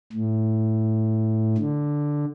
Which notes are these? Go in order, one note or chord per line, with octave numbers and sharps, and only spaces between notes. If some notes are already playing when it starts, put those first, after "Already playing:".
A2
D3